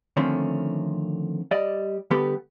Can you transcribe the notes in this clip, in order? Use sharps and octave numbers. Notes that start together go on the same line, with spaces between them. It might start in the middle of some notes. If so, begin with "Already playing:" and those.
D3 D#3 F3 A3 C4 C#4
G3 D5 D#5
D3 G3 B3 G4 A4 B4